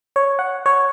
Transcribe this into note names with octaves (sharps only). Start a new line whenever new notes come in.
C#5
F#5
C#5